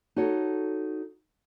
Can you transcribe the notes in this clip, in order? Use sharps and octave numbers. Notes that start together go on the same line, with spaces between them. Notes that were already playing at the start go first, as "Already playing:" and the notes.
D#4 F#4 A4 C#5